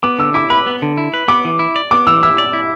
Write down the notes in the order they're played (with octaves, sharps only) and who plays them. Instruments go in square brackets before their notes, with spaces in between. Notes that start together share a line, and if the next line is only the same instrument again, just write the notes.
[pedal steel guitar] B3 [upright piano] D6
[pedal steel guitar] D3 [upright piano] E6
[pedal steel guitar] E4 [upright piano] D6
[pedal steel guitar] B4 [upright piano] B5
[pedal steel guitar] B3
D3
E4
B4
[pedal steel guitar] B3 [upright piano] D6
[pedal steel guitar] E3
E4
D5
[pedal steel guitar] B3 [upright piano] D6
[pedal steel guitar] E3 [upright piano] E6
[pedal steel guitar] E4 [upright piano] E6
[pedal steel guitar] D5
E4